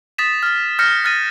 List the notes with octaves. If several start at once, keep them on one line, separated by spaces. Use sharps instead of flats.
D#6 A6 B6 E7
F6 A6
F6 G6 A#6 C#7
F6 F#6 A6 A#6 D#7